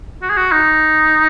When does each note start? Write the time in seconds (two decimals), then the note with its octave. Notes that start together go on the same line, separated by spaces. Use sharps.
0.22 F#4
0.30 G#4
0.37 F#4
0.52 D#4